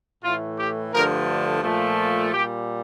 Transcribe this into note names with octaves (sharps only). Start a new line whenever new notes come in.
A2 E3 A3 F4
G4
G2 D3 F3 A3 A#4
A#2 F3 A3
A#2 G3 G4